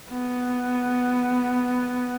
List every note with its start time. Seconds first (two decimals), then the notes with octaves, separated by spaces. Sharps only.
0.11 B3